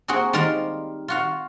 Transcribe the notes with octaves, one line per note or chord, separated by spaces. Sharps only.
A#3 C4 F#4 G#4
D#3 G3 F4 A#4 C5 F5
F4 F#4 F5